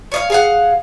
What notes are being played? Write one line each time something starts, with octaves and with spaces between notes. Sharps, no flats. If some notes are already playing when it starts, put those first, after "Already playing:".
C#5 D#5 F5
G#4 F5 F#5